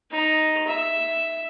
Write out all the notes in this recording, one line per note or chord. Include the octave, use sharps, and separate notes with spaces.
D#4
E5